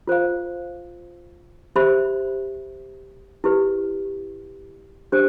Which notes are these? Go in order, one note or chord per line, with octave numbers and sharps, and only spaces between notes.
F4 C5 F5
G4 C5 E5 B5
E4 G4 B4
D4 G4 C5